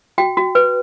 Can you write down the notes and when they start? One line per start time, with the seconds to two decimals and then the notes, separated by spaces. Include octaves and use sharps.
0.18 F#4 G5
0.37 F#4
0.55 B4